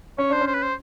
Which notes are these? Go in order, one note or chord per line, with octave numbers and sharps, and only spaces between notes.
C#4 C#5
D4 C5
C#4
C5
B4
C5